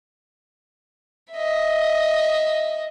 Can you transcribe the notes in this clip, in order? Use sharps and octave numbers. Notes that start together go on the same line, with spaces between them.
D#5 E5